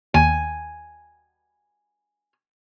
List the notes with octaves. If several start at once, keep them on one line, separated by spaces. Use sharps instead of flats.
D#2 G#5